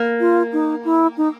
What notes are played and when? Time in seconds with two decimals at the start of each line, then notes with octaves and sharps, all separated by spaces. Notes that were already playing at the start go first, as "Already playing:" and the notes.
Already playing: A#3
0.20 F4
0.53 D#4
0.85 E4
1.17 D#4